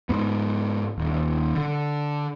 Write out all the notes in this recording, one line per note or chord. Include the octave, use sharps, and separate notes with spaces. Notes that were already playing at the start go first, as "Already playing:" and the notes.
G#2 B3
D#1
D3